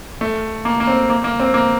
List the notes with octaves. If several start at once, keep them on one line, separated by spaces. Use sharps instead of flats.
A3
A#3
A#3
C4
A#3
A#3
C4
A#3